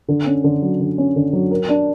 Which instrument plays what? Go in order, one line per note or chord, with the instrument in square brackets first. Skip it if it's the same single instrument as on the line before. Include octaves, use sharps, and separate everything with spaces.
[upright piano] D3
C#4
D3
F#3
D3
C#4
D3
F#3
A#4
D4